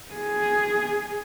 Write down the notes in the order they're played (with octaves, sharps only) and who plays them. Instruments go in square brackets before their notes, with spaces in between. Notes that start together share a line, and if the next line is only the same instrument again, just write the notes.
[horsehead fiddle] G#4